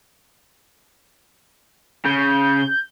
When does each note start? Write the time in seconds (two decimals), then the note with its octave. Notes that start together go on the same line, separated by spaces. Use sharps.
2.05 C#3 G6